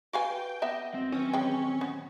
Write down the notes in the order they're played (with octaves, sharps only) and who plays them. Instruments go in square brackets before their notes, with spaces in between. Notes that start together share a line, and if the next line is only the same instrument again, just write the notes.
[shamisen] F#4 F5 G#5 [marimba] B4 B5 [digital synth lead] G5
[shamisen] B3 E5 [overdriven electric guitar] D#5 [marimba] F#5 D6
[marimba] D#2 F#4 A#6 [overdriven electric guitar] C4
[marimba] D#3 F#3 B4 [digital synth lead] C#4
[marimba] A#2 D#3 E3 [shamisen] G#3 G5
[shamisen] B3